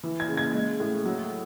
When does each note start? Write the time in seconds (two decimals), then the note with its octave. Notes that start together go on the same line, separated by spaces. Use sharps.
0.04 E3
0.20 G#6
0.28 C#3
0.37 G#6
0.54 G#3
0.80 A2
1.05 F#3